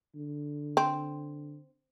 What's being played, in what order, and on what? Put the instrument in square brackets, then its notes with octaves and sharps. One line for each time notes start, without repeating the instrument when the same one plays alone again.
[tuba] D3
[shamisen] C4